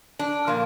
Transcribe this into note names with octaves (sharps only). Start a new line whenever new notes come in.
D4
A#2 F3 A#3